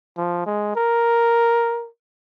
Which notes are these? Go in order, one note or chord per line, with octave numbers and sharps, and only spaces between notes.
F3
G#3
A#4